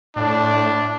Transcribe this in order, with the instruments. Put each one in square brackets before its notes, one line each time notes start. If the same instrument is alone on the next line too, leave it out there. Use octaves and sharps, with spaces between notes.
[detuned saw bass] A2 [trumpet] D4